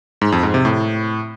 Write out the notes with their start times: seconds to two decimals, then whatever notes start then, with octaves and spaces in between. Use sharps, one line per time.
0.21 G#2
0.32 F2
0.43 G#2
0.54 C3
0.65 A2